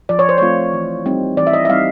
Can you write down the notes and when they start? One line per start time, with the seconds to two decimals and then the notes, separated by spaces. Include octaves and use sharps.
0.09 F3 D5
0.19 C#5
0.29 C5
0.38 A3 C4 F4 C#5
0.73 E3
1.06 G3 C4 D#4
1.37 E3 D5
1.47 E5
1.53 D#5
1.65 E5
1.69 G3 C4 D#4 F5